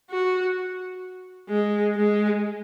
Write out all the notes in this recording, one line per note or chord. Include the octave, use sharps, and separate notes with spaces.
F#4
G#3
G#3